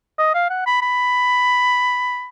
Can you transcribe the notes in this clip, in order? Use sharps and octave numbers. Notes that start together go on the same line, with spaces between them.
D#5
F5
F#5
B5
B5